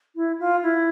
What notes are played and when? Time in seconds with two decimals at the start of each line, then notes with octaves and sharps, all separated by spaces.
0.16 E4
0.40 F4
0.63 E4